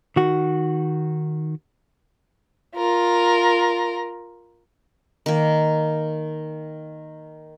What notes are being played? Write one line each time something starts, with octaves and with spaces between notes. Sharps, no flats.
D#3 F#4
F4 A#4
D#3 A#3